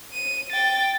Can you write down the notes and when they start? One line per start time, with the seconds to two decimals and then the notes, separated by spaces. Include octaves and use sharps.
0.12 D#7
0.52 G5 A6